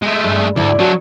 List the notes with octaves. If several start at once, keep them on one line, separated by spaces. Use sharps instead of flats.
G#3 A3
G2
D2 G#2 E4 D5
F#3 D4 F#4 A#4 C#5